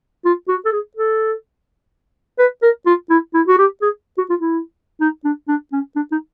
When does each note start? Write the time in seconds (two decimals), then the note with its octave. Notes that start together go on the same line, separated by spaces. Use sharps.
0.25 F4
0.48 F#4
0.65 A4
0.72 G#4
0.97 A4
2.39 B4
2.62 A#4
2.86 F4
3.10 E4
3.34 E4
3.47 F#4
3.58 G4
3.82 G#4
4.18 F#4
4.30 F4
4.41 E4
5.01 D#4
5.25 D4
5.48 D4
5.72 C#4
5.96 D4
6.12 D#4